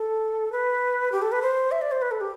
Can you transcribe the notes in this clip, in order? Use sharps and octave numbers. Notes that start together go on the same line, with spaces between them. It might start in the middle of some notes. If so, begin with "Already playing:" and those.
Already playing: A4
B4
G4
A4
B4
C5
E5
D5
C5
B4
A4
G4